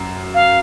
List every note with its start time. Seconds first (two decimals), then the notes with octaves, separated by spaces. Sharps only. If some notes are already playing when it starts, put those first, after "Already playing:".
Already playing: F#2
0.34 F5